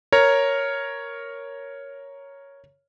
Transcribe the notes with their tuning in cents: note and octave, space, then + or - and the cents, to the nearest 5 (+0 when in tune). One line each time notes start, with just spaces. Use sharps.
A#4 +0 C#5 +0 A#5 +0